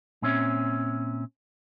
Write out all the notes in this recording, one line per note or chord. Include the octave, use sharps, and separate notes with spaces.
A#2 C4 C#4 E5